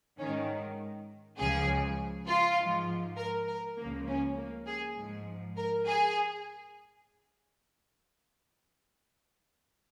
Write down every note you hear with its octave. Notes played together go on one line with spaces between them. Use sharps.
G#2 D#3 C#4
C#2 C#3 F3 G#4
F4
G#2 F3
A#4
A#4
C#2 C#3 F3 A#3
C#4
A#3
G#4
G#2 F3
A#4
G#4